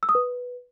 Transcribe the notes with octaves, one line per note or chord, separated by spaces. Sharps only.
E6
D#6
B4